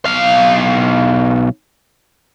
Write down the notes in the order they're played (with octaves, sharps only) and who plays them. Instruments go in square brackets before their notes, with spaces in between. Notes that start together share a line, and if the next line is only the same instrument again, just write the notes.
[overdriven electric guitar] B1 F5